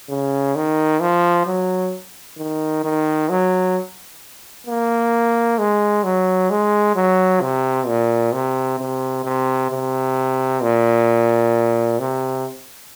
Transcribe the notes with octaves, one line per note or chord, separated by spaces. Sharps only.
C#3
D#3
F3
F#3
D#3
D#3
F#3
A#3
G#3
F#3
G#3
F#3
C3
A#2
C3
C3
C3
C3
A#2
C3